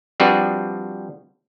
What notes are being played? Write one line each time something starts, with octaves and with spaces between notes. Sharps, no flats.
F3 G3 C4 D4 F#4 B4